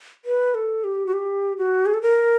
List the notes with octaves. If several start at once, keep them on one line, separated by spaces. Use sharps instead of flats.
B4
A4
G4
F#4
G4
F#4
G#4
A4
A#4